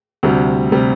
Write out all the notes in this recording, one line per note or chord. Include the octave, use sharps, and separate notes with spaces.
D2 C3 G3
C3 G3